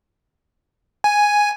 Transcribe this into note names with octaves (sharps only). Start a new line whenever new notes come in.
G#5